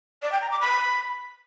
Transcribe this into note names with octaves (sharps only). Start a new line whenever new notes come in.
D5
G5
A#5
D6
B5